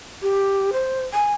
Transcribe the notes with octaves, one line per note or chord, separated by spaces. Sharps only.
G4
C5
G#5